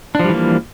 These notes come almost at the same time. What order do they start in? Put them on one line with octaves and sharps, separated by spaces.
D4 F3 G3 E3 A#3